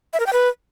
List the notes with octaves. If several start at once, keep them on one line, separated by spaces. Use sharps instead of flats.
E5
A#4
G5
B4